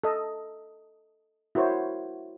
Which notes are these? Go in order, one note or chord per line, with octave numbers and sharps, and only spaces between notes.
A4 D#5
E4 F#4 A#4 C5 C#5